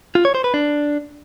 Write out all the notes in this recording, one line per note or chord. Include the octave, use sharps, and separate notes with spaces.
F4
C#5
C5
B4
D4